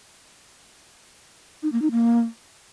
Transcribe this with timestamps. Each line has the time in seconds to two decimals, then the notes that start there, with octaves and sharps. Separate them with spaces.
1.62 D#4
1.72 A#3
1.82 D#4
1.91 A#3